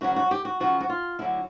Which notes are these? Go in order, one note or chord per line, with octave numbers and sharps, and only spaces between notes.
D2 C#3 F#3 F#4
F#4
G4
F#4
F#2 C#3 F3 F#4
F#4
F4
D2 D3 F#3 E4